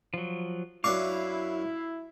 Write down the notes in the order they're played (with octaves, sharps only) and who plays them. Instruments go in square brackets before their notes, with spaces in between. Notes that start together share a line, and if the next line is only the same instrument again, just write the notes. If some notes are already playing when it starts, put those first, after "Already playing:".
[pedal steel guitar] F3 F#3
[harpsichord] F#2 D4 C#6 [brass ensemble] E4 [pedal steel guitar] F5 [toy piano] D6